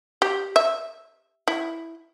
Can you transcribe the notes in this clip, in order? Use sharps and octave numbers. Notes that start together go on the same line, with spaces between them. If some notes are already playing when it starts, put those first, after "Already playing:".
G4
E5
E4